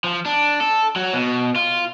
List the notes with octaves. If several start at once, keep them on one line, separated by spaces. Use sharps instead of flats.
F3
D4
A4
F#3
B2
F4